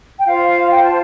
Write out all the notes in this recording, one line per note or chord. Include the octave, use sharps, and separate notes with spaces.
G5
F4 C5 F5
G5
A5